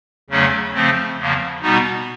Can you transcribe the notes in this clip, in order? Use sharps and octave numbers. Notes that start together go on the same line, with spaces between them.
E2 C#3 F#3 A3 C#4
C#3 F3 A3 C4
E2 C#3 F3 A#3
B2 G3 B3 D#4 F#4